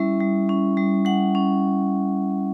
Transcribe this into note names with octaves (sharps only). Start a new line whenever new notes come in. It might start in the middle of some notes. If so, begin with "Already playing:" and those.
Already playing: G3 C#4 E4 E5
G3
C#4
G3
G3 F#5
C#4